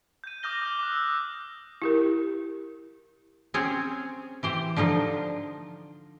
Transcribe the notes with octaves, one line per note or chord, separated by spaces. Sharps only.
G6 D#7
D6 D#6 F6 G6 A#6 G7
D#6 G7
D6 D#6 F#6
E6
E4 G4 A#4
C4 C#4 G#4 C#5
E3 G4 C5
D3 F3 D#4 F4